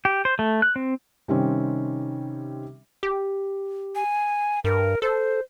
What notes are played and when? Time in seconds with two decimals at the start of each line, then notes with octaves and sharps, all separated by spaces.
0.05 G4
0.25 C5
0.39 A3
0.62 F#6
0.76 C4
1.28 C3 D#3 G3 C4 C#4
3.03 G4
3.95 G#5
4.64 G2 A#4
5.02 A4 C5